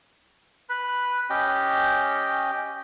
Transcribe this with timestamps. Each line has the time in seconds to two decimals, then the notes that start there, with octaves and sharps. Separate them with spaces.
0.69 B4 B5
1.30 C#4 G4 D#5 G5